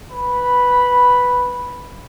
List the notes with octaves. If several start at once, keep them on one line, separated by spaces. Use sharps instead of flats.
B4 B5